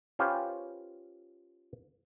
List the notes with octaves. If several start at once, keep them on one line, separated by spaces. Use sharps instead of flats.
C#4 F4 G4 B4 C5 G5